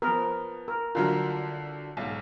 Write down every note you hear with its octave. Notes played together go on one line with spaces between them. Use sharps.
F3 B3 A#4
A#4
C2 D3 F#3 F4 A#4
B1 G#2